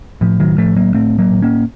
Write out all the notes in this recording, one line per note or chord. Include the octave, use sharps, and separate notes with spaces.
A2 F3
D#3 F#3
A2 F3 A3
F#3 A#3
A2 A3 C4
F#3 A#3
A2
A#3 C#4